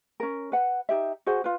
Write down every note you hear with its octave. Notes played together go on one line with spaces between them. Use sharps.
C#4 A#4
B4 F#5
D#4 G4 E5
F#4 G#4 C5 F#5
F4 B4